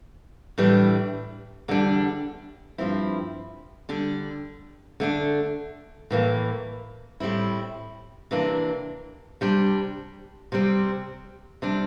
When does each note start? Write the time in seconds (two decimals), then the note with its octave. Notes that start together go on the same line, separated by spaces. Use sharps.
0.58 A2 E3 G3 D4
1.68 E2 D3 G3 D4
2.78 G2 F3 C4 E4
3.89 D3 G3 D4
5.00 D3 A3 D4
6.10 A2 E3 A#3
7.20 A2 G3 C4 E4
8.31 C3 E3 A#3 D4
9.41 C3 G3 D4
10.52 C3 G3 C4
11.62 C3 G3 D4